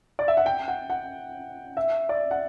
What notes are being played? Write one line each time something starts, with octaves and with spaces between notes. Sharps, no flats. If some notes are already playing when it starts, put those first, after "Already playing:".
D5
E5
F#5
G5
F#5
F#5
E5
D5
F#5